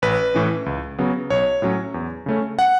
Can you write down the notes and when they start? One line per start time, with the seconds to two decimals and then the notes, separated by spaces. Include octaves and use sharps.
0.02 A1 B4
0.34 A2 E3 C#4
0.66 C#2
0.99 C#3 F#3 B3
1.30 B1 C#5
1.62 A2 F#3 C#4
1.94 E2
2.26 C#3 A3 C#4
2.59 F#5